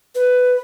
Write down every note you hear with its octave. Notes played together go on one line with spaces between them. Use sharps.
B4